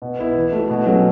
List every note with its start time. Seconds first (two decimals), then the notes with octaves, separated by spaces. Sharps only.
0.02 B2
0.19 B3 E4
0.35 E3
0.52 A3 F#4
0.70 B2
0.86 F#3 A3 C#4 F#4